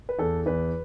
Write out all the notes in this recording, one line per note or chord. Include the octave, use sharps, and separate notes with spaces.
B4
E2 A4
E2 B4